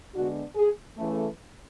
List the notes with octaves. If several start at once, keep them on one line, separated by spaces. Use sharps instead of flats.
D3 G#3 B3 D4 F#4
G#4
C#3 E3 A3